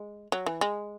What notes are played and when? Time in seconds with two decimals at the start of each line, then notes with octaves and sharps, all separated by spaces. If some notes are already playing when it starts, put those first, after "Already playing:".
Already playing: G#3
0.32 F#3
0.46 E3
0.61 G#3